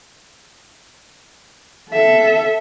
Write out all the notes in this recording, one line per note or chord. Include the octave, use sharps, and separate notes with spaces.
A4 E5